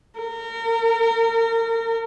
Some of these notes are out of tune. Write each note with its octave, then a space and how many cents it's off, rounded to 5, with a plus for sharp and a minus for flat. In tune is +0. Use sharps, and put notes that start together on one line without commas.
A#4 -35